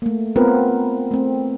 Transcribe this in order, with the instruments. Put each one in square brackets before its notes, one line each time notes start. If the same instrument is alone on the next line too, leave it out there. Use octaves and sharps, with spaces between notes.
[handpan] A3 A#3
B3 C4 F4 A#4 B4
A3 C4